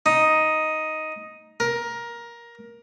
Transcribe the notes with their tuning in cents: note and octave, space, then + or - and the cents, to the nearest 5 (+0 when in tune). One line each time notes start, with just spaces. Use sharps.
D#4 +5
A#4 +15